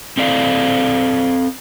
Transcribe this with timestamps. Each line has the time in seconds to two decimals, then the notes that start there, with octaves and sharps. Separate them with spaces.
0.17 C4 A4 D5 F5